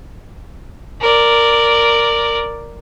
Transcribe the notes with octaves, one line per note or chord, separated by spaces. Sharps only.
A#4 D5